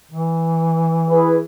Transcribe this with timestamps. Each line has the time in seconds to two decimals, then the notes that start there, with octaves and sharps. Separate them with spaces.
0.12 E3
1.09 E4 G#4 B4